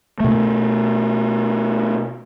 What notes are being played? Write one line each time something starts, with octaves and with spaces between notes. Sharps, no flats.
B2 A3